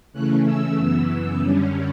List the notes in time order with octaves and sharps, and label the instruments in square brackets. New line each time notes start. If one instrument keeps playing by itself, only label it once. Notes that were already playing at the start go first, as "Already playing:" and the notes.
[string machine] C#3 E3 A3 C#4 F#6
E6
F#2 C#3 E3 B3 E6
F#2 D3 G3 C#4